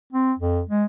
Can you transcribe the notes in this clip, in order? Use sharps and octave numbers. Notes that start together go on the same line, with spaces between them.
C4
F2
G#3